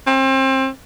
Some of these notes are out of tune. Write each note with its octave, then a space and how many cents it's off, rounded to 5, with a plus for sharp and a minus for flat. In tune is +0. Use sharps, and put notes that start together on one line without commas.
C4 +30